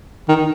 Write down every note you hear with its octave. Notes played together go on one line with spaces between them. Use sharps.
D#3